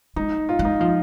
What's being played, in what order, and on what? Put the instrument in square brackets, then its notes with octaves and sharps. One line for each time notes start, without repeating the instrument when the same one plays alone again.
[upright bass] G#3 [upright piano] D#4
[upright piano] F4
[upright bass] G#3
[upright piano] D#4
[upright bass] F3 [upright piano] F4